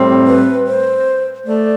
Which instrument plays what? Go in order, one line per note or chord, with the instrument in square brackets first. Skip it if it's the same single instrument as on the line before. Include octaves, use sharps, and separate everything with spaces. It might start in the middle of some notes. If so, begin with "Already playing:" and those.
Already playing: [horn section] A2 G3 C4
[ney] B4
C5
[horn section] A3 [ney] D5